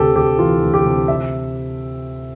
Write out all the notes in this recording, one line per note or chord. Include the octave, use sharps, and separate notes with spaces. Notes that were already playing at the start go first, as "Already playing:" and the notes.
Already playing: D2 C3 G4 A4
D2 G4
E3 F4
D2
G4
C3
E5